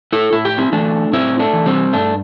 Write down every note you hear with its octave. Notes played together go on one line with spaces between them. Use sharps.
E4 A4
A2 E4
G4
C4 E4
E3 A3 D4
A2 C4 E4
A3 D4
E3
G3 C4
G2 A3 D4